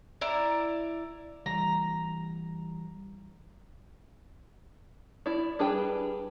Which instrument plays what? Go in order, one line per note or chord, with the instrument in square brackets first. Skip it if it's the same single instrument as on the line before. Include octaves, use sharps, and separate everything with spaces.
[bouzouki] E4 D5 A#5
[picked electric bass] E3 G3 [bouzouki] A#5
[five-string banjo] E4 D5
G3 D4 G#4 B4 G5